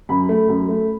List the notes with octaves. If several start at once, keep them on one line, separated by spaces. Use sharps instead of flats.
F#2 B5
A3
F#2
A3